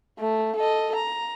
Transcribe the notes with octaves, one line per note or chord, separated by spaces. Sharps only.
A3
A4 D#5
A#5